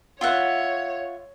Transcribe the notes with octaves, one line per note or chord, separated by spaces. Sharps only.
F4 C#5 E5 F#5